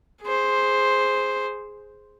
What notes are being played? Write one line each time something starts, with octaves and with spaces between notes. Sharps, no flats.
G#4 C5